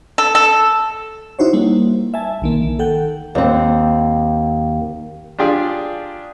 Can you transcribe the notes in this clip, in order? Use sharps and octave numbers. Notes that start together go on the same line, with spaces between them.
A4
A4
D#4 E4 F#4 C5 C#5
G3 A#3
E5 G#5 A5
B1 D#3 A#3
D#3
D#3 A4 F#5 G5
D#2 C4
D4 F4 G4 G#4 D5